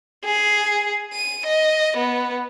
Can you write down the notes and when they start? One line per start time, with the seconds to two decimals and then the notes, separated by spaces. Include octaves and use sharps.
0.25 G#4
1.13 D#7
1.46 D#5
1.97 B3